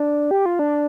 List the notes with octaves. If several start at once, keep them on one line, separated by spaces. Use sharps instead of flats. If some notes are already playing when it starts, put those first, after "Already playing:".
Already playing: D4
G4
F4
D4